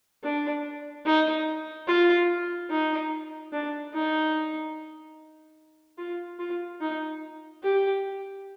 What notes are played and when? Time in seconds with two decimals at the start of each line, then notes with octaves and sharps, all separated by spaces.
0.23 D4
1.06 D#4
1.87 F4
2.70 D#4
3.52 D4
3.94 D#4
5.98 F4
6.39 F4
6.81 D#4
7.63 G4